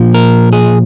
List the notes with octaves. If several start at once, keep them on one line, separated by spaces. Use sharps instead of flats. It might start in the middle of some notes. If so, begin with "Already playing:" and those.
Already playing: A#2 F3
A#4
G#4